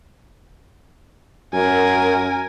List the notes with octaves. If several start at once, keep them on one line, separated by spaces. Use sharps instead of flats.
F#2 A#4 G#5